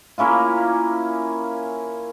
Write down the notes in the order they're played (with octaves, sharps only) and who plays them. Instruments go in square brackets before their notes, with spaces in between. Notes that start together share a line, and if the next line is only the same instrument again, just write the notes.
[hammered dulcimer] A#3 C#4 E4 F4